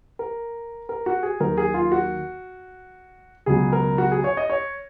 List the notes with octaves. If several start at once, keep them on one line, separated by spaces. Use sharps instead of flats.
A#4
A#4
F#4
G#4
D#2 D#3 F#3 A#4
G#4
F4
F#4
C#2 B2 F#3 G#4
A#4
F#4
G#4
C#5
D#5
C#5